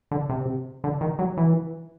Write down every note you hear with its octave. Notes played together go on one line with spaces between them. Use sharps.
D3
C3
D3
D#3
F#3
E3